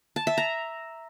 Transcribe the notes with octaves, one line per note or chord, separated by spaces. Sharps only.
A5
E5
A#5